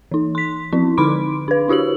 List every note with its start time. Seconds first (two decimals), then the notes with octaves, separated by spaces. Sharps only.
0.12 E3 D#4
0.35 C6 B6
0.72 F3 C4 E4
0.98 D3 D#4 B5 C6 D6 D7
1.48 D4 B4
1.68 D4 E4 F#4 G4 F#7